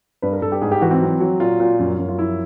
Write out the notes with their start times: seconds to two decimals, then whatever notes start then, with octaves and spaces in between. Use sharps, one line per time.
0.22 G2 B4
0.33 A#4
0.42 G2 A4
0.52 G4
0.62 G#2 G#4
0.72 G4
0.81 E3 F#4
0.91 C4
1.01 F#3
1.20 F#3
1.40 A#2 F4
1.60 A#2
1.79 F#2
1.99 F#2
2.09 F4
2.19 F3 E4